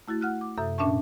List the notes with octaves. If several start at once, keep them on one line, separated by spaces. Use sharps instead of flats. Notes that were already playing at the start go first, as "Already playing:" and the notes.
A3 E4 F#4 A6
F#5 F6 F#6
D6
F#2 C3 A4 E5 D#6 G6
A#2 C#4 D4 E5 A5 C#6